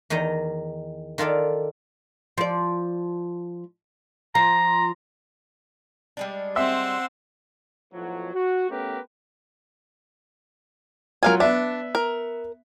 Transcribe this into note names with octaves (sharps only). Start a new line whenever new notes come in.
E2 D#3 D#4 D#5 A#5
D#3 F4 A4 D5
F3 D5
F3 A#5
G3 G#3 D4
C4 E5 F#5 C6 E6
B1 A2 F3 F#3
F#4
A3 B3 C#4 G4 A#4 B4
F#3 F4 A#4 F5 G#5
B3 D4 E5
A#4